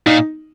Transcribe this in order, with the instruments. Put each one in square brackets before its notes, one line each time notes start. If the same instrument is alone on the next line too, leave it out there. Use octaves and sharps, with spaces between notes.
[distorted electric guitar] A#2 [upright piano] D#4